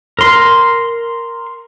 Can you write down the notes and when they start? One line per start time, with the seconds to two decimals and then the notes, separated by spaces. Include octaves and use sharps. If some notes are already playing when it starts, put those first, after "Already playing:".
0.19 A#4 C6